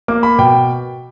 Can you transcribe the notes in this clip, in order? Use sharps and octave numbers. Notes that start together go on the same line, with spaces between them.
A#3 D6
B5
B2 G5